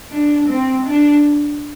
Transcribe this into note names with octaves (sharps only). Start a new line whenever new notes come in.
D4
C4
D4